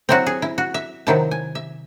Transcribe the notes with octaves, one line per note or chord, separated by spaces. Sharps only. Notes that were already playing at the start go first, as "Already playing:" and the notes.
F#3 C4 E4 F#4
G#4
E4
F#4
E5
C3 D#3 F#3 C4 E4 A5
G#5
E5